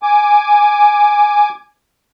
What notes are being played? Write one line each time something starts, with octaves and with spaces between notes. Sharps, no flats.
G#5 D6